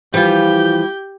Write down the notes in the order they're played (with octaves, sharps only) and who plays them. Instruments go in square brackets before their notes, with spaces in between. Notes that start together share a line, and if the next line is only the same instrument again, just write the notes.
[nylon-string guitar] E3 F3 [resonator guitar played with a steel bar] G3 F4 [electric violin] G4 G6